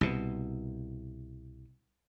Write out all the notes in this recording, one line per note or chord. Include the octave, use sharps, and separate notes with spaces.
C2 B2